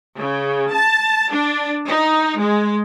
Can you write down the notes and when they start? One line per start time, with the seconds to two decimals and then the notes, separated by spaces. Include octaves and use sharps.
0.17 C#3
0.71 A5
1.31 D4
1.87 D#4
2.38 G#3